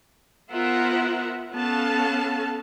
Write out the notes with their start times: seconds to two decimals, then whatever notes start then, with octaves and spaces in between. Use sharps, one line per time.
0.52 B3 F4 A#4 C5 E5 F#5
1.53 B3 C#4 A4 F5 A5